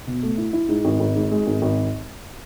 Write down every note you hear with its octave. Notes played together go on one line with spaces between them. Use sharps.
B2
A3
E4
E4
G#2
G#1
G#1
G#2
G#3
G#1
G#1